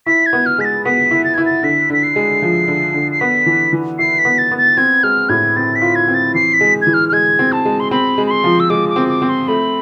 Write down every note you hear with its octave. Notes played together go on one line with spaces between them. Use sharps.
E4 B6
G#6
B3
F6
G#3 B6
A6
B3 B6
E4
A6
E4 G#6
A6
D3 B6
D3 B6
C7
G#3
F3
D3
D3
C7
B3 B6
E3
E3
E4 C7
B6
B3
A6
B3
A6
C4 G#6
G#3 F6
A2 G#6
C4 A6
B6
F4
G#6
C4
A6
E3 C7
B6
G#3
G#6
E3
F6
F6
G#3 G#6
C4
A5
G#3
C6
C4 B5
G#3
B5
C6
F3
E6
G#3 D6
D6
C4
D6
C4
C6
A3 B5